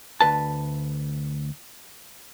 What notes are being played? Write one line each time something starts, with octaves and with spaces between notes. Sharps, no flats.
D2 B4 A5